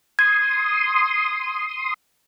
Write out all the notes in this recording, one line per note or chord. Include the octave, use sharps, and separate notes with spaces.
C6 D#6 G#6